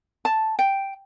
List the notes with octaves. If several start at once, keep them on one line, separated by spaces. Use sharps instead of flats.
A5
G5